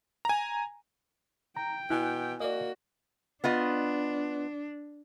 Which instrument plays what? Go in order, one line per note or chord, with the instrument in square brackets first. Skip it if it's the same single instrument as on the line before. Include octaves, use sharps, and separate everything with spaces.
[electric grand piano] G#5 A#5
[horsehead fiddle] G5 [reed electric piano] A#5
[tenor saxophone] B2 [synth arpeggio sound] E4 [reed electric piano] G#5 F#6
[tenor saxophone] A#3 [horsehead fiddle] F#4 [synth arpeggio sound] D5 D#5
[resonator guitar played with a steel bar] B3 F4 D#5 [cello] D4